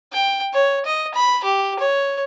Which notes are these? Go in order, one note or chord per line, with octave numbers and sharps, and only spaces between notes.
G5
C#5
D#5
B5
G4
C#5